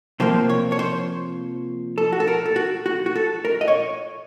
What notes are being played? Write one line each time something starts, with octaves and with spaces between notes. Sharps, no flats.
C3 F3 A#3 C5
C#5
C#5
C5
A4
F#4
A4
A#4
A4
F#4
F#4
F#4
A4
A#4
D#5
C#5